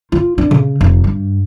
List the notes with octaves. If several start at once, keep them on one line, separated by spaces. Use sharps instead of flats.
F4
D4
C#3
F1
G2